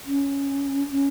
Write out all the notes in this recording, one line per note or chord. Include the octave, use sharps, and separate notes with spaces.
C#4
C#4